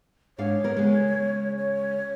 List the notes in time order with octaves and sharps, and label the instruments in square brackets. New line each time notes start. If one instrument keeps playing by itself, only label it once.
[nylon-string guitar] G#2 D4 F5 [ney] C#5
[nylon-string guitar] B3 A#4
C#3 G#3
[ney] C#5